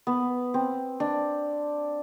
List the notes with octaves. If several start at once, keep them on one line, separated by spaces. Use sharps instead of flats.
B3
C4
D4